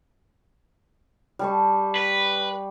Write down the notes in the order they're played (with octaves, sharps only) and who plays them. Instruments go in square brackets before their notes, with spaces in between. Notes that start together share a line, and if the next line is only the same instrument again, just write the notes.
[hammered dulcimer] G3 A5 C#6
[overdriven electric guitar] B4